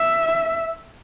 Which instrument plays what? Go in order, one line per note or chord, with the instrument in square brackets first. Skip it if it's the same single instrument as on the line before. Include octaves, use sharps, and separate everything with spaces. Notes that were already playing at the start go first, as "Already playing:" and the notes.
Already playing: [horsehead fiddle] E5